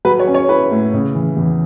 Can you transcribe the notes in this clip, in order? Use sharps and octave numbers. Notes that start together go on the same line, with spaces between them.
F#3 B4
C#5
C#4
C#5
E4 B4
A2
C#3
E3
E2